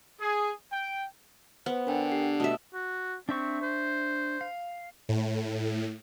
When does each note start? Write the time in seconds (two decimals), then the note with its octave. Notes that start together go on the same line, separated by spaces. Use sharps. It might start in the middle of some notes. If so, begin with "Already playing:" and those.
0.20 G#4
0.72 G5
1.66 B3 B4 C5
1.87 D3 A#4 G5 G#5
2.12 D4 G4 C7
2.40 B2 A3 E5 A5 D#6
2.74 F#4
3.29 C4 D4 E5 C#6
3.62 C5
4.41 F5
5.09 A2